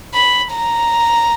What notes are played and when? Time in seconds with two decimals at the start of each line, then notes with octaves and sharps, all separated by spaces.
0.14 B5
0.53 A#5